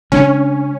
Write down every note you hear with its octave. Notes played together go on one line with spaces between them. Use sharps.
C#3 G#3 C#4 D4